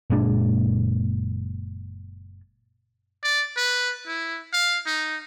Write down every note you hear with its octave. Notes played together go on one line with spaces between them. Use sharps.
F#1 A#2 G#3 D4
D5
B4
E4
F5
D#4